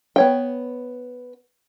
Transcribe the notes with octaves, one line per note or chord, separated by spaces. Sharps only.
B3 C#5 G5